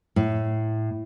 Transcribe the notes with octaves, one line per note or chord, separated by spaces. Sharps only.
A2